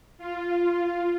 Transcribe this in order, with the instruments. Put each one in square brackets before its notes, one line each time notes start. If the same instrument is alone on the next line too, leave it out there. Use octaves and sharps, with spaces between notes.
[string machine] F4